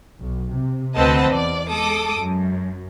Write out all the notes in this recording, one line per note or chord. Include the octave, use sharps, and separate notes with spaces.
B1
C3
D2 C4 B4 D#5 F#5 A5
E2 D5
G#3 A4 D6 D#6
F#2